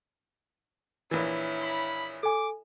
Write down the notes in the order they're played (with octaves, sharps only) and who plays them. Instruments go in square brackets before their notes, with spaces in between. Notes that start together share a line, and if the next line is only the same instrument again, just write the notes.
[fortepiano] A#1 E3 [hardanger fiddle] E4 C#5
[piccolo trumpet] B5
[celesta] A4 G#5 [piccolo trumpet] D6